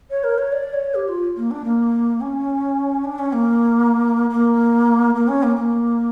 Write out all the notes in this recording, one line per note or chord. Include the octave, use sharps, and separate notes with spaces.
C#5
A#4
C#5
D5
C#5
G4
F4
A#3
D4
A#3
C#4
D4
C#4
A#3
A#3
A#3
C#4
A#3
A#3